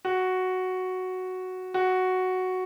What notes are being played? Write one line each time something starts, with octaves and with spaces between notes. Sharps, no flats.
F#4
F#4